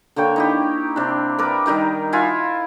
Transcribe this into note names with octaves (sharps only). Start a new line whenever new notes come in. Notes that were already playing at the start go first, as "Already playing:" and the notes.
D3 A#3 C#5 G5
D#4 E4 G4
C3 D4
A#4 B4 D5 E5
D#3 G3 D#4 A#4
E4 F4 G#5